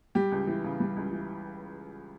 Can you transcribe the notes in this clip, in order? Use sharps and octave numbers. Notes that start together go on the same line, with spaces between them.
G3 G4
C#2
E3
C#3
G3
C#2
E3